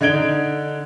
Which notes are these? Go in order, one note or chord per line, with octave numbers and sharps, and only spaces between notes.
D3 D#4 G#6 D7 G7